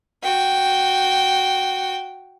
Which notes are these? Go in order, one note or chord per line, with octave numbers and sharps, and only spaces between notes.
F#4 G5